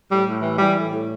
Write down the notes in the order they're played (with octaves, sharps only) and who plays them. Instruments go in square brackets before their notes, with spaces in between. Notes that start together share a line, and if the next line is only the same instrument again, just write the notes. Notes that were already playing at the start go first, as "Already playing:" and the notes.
[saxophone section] A2 G3
A2
E3
E3 G3
A2
A2